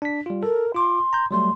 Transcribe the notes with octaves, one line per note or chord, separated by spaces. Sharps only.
D4 B6
G3 F4
A4 A#4
F4 C6 D6
A#5 G6
F#3 G3 A3 C6